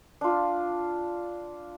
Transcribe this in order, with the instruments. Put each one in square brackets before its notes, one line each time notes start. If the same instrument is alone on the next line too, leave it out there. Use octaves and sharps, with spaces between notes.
[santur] D4 F4